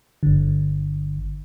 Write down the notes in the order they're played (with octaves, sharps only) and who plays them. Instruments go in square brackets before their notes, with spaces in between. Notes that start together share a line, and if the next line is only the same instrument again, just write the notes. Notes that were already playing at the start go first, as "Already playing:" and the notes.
[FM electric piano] G1 D3